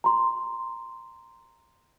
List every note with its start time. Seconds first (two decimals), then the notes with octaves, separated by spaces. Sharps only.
0.04 A#5 C6